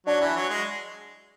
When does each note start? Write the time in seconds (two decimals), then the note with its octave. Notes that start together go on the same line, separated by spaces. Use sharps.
0.06 F#3 D4
0.21 E3
0.36 F#3
0.50 G#3